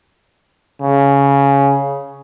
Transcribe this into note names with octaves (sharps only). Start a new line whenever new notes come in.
C#3